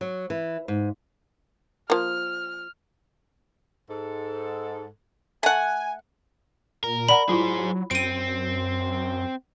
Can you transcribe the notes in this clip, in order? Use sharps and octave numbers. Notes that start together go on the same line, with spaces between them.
F#3
E3
G#2
F3 A#3 F6
G#2 A4
A3 F#5 G#5
A#2 A#4
D5 F#5 A#5 B5
F#3 E4 F4 G#4 C5
F#2 C4 D7 D#7